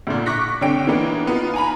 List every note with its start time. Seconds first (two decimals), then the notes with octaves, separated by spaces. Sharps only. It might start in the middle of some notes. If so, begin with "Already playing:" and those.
0.07 D2 A#2
0.26 C#6 D6 F#6 A#6 B6 C#7
0.61 C2 D3 C#5 G5 D7
0.87 E3 A#3 B3 D4 D#4
1.27 B3 D#4 F4
1.54 G#5 A#5 B5